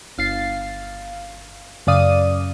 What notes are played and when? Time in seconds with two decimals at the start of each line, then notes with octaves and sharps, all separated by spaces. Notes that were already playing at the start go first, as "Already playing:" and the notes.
0.18 G1 F5 A6 C7
1.87 F#2 C#3 D5 F5 D#6 D#7